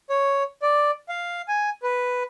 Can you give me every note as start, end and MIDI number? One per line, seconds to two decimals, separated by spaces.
0.10 0.43 73
0.62 0.91 74
1.09 1.42 77
1.48 1.70 80
1.83 2.23 71